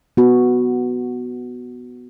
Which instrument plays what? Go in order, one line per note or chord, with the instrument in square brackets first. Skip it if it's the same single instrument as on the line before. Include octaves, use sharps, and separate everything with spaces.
[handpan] B3 F#4